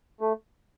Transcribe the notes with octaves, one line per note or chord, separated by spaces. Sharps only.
A3